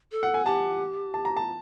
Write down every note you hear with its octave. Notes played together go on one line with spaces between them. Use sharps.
A4
F#5
G#5
G4 A5
A5
A#5
A5